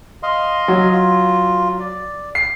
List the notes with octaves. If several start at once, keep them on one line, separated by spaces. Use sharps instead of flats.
D#5 F5 C6
F#3
F4
D5
C7